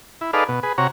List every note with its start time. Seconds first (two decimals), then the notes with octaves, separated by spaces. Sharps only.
0.21 E4
0.33 D#4 G#4 A4 B4 D5 F5
0.48 B2
0.63 G#4 B4
0.78 C3 F#4 C#5 A#5